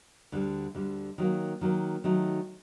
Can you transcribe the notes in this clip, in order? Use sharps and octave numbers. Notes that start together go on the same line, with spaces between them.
D2 D3 G3
D2 D3 G3
D#3 F#3 A#3
D#3 F#3 A#3
D#3 F#3 A3 D#4